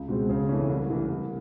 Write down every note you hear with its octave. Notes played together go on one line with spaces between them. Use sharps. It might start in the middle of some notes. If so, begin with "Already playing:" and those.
Already playing: C#2
B2 G#3 C4
C#3
E3 A3 C#4
C2
C3 E3
C2